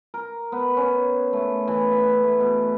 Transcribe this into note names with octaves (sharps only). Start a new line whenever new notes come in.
A#4
B3
C#4
A3
E3
E5
A3
B2